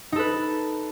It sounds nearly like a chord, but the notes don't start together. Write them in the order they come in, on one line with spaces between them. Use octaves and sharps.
D#4 A4 B4